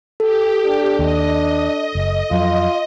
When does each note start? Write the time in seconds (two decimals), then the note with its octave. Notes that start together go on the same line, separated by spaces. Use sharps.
0.20 G4 A4
0.66 D4
0.99 D#2 D#5
1.95 F#1
2.31 F2 F#3 F4